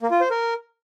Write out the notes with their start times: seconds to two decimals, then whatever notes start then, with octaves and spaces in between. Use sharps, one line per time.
0.01 A#3
0.11 F4
0.21 C5
0.30 A#4